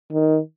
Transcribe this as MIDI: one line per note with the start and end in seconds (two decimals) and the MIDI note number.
0.13 0.39 51